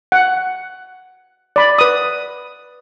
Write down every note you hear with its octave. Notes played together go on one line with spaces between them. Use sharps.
F#5
D5 B5
B4 D#6